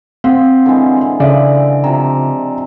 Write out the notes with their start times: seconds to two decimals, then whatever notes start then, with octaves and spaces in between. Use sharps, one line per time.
0.24 C4 F5 F#5
0.66 D3 E3 G#3
1.20 C#3 A4 D5 E5 F5
1.84 C3 F3 A#5